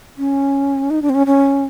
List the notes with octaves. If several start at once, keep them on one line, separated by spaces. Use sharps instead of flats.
C#4
D#4
D4
C4
C#4
C#4